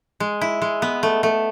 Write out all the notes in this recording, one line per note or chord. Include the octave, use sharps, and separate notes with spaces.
G#3
E4
G#3
B3
A3
A3